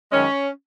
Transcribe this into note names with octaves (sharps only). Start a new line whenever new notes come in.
F#2 D#3 G#3 C#4